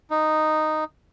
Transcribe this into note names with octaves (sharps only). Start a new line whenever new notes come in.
D#4